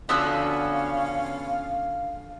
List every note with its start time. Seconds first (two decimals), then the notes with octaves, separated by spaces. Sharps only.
0.09 D3 F3 B3 C#4 F#4 F5 E6 F#6